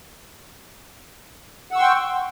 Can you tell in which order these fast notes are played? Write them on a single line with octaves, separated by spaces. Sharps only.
F#5 E6 C#6 C6 G5